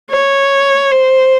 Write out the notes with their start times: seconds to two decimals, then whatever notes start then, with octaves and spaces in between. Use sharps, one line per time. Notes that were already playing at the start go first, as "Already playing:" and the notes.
0.10 C#5
0.91 C5